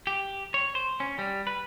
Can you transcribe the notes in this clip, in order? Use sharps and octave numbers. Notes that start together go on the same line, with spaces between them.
G4
C#5
C5
C#4
G3
B4